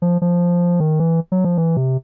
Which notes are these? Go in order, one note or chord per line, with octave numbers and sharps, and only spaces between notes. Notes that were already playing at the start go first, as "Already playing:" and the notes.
F3
F3
D#3
E3
F#3
F3
E3
C3